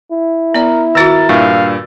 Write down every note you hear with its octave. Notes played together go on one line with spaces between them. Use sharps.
E4
B3 A#4 D5
D#3 F4 F#4 A#4 E6 A6
G2 A#2 F5 C#6